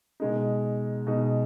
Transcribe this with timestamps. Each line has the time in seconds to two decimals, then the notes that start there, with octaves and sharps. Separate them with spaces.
0.20 B2 G#3 D#4
1.07 B2 G#3 D#4